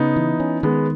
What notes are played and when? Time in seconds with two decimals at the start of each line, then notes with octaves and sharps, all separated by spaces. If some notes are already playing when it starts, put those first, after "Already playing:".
Already playing: C#3 B3 D#4
0.16 E3
0.40 C#4
0.63 D#3 G#3 B3